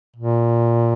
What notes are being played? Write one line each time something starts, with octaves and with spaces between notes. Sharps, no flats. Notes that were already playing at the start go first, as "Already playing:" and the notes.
A#2